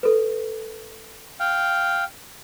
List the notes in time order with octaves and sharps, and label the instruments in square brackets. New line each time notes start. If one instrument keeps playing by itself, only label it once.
[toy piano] A4 B4
[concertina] F5 G5